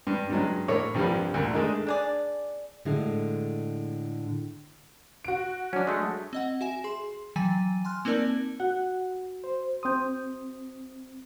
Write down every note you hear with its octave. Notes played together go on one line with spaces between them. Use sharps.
G2
G2 C#3 F#3 G#3
A2 A#3 C#5 D5
C2 G2 F3 G3
D2 A#2
D#3 G#3 A3 D4 G#4
D4 G#4 D5
A2 D3 G#3
F#4 D7
F#3 C#4 D4
G#3 A3
C4 D#5 F#5
F#4 E5 G#5 E7
G#4 C6
E3 F#3 G5 G#5 A6 D#7
G#5 C6 F6 F#6
A#3 C4 D#4 A#4 D5 A5
F#4 F#5
C5
C4 C6 D#6 G6